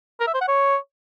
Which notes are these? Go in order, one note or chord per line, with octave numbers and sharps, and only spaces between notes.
A#4
E5
C5
F#5
C#5